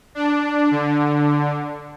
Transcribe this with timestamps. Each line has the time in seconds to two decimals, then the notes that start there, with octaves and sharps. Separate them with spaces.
0.15 D4
0.71 D3